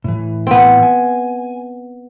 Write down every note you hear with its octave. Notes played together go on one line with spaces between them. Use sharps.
A2 E3
B3 C4
G#5